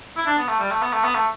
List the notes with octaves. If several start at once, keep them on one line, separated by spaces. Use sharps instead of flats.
E4
D4
B3
A3
G3
A3
B3
A3
B3
A3